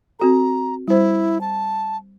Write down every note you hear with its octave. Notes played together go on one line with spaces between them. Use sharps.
C4 F#4 A4 A#5
G3 E4 C5
A5